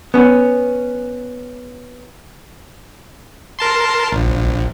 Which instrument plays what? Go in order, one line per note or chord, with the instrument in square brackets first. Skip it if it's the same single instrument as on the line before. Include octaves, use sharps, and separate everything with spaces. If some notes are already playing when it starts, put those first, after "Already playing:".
[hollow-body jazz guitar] B3 C#4
[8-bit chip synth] A#4 A5 C6
A#1